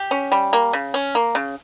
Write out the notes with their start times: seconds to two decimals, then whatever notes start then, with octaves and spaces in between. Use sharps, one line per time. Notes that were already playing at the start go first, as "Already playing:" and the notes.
Already playing: G4
0.11 C#4
0.32 G3
0.53 A#3
0.73 C#3
0.94 C#4
1.15 A#3
1.35 C#3